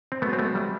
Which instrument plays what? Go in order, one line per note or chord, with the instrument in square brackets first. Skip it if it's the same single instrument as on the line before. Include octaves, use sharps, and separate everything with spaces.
[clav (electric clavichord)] C4
[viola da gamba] F#3 G#3 [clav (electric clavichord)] A3 B3
[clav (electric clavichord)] C4
A3 B3
G3 A3